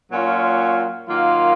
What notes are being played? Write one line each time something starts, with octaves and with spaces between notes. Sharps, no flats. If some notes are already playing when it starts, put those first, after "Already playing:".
A#2 F#3 C#4 F4
D#3 F#3 A#3 F4